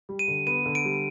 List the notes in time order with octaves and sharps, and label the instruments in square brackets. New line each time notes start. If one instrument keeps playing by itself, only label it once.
[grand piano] G3
[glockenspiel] D#7
[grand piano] D3
[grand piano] B3 [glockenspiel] D#7
[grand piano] D3
[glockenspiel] D7
[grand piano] G3